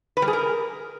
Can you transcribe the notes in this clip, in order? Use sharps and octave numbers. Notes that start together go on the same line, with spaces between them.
B4
G3
G#4
A#4